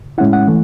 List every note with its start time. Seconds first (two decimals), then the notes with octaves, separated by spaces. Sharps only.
0.18 A2 G#3 C#4 E4 F#5
0.33 F#5
0.47 E3 A3